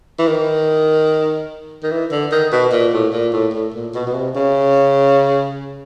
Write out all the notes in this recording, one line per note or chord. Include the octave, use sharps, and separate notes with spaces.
E3
D#3
D#3
E3
D3
D#3
B2
A#2
A2
A#2
A2
A2
A#2
B2
B2
C3
C#3